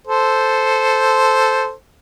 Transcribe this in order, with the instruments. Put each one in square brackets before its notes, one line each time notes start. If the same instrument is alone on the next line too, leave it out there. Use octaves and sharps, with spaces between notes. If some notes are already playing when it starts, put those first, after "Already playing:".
[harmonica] A4 C5